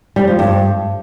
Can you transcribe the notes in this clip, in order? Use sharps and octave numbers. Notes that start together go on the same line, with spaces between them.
G3
F3
G2